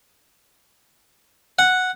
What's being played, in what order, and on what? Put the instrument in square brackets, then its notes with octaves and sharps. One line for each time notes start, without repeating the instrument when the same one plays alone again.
[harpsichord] F#5